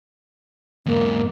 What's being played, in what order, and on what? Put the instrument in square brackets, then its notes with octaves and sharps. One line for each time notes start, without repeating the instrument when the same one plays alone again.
[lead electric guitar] E2 G#2 [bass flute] A#3